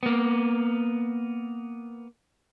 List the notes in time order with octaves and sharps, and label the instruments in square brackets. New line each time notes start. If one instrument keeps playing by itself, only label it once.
[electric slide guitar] A#3 B3